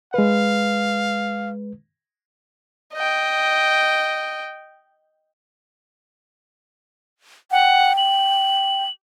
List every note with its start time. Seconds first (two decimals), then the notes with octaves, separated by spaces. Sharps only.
0.14 G#3 B4 F5
2.94 D#5 G5
7.52 F#5 G5
7.97 F#7